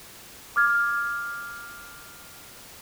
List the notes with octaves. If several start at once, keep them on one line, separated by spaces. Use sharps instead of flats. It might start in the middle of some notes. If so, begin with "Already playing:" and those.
D6 F6 G#6